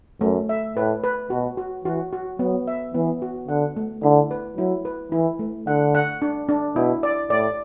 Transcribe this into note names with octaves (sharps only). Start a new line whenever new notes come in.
F#2 A3
E5
A2 B4
B4
B2 F#4
F#4
E3 F#4
F#4
F#3 B3
E5
E3 B3
F#4
D3 F#5
A3
D3 E4
B4
F#3 E4
B4
E3 E4
A3
D3 F#5
F#5
D4
D4
B2 E4
D5
A2 D5